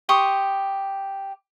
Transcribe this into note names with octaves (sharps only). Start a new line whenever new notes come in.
G4 C6 C#6 D#6